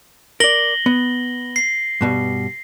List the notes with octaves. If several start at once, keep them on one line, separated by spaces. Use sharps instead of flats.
A#4 D5 A#6 F#7 G7
B3
C7
G2 B2 G3